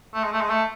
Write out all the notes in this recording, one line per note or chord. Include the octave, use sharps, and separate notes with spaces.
A3
G#3
A3
G#3
A3